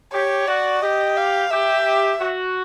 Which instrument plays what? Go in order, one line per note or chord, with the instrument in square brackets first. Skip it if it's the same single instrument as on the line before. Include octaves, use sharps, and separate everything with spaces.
[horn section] G4 [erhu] C#5
[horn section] F#4 [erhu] D5
[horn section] G4 [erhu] D#5
[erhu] F5
[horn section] G4 [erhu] E5
[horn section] F#4